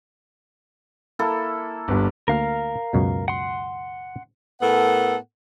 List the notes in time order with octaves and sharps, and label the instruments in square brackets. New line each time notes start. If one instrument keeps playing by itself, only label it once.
[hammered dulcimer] A#3 E4 A4
[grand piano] G1 G2
[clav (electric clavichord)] D2 A#3 [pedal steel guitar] A#4 F5 F6
[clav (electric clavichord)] C#2 F#2 B2
[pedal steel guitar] F#5 C6
[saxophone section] A2 B3 A4 A#4 F#5